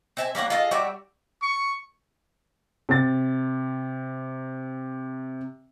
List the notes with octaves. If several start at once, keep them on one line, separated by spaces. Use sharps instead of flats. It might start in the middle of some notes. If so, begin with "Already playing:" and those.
C4 E5 G#5
G3 A#3 C#4 F#5
F4 G#4 A4 D#5
G3 F#4 D5 E5
C#6
C3 A6